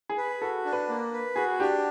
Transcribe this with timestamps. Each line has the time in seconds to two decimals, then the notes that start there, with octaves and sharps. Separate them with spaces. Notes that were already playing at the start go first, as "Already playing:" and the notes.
0.09 G#4
0.18 B4
0.42 F#4 A4
0.65 D4
0.73 B4
0.89 A#3
1.13 B4
1.36 F#4 G#4
1.60 D4 G4